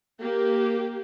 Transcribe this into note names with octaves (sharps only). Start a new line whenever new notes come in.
A#3 G4